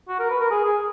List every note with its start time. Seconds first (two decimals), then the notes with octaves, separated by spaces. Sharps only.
0.09 F#4
0.19 A#4
0.30 B4
0.40 A#4
0.51 G#4
0.65 G#4